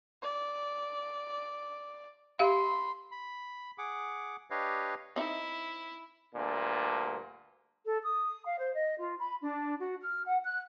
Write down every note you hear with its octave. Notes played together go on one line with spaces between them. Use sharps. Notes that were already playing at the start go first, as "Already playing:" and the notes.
D5
G4 E5 F5 B5 C6
B5
G#4 F#5 D6
D4 G4 B4 C#5 D#5 F5
C4 D#4 E4 E5
D2 G2 A#2
A4
D#6
F5
C5
D#5
F4
B5
D4
F#4
F6
F#5
F#6